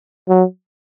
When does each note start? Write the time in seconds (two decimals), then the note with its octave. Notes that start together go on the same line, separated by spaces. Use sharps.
0.29 F#3